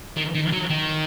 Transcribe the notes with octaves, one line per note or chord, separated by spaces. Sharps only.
D#3
D#3
F#3
D#3